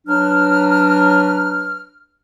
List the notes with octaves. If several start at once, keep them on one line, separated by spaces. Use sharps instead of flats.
F#3 D4 B4 F6